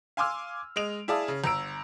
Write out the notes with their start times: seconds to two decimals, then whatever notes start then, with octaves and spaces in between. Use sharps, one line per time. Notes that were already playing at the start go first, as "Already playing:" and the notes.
0.17 F5 G#5 C6 D6 E6 F6
0.76 G#3 D#5 D7 F7
1.08 E4 G#4 D5 F5 A5 D#6
1.28 C#3
1.44 G1 A#5 E6 D7